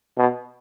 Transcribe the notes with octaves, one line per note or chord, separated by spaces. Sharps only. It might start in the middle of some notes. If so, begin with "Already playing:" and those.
B2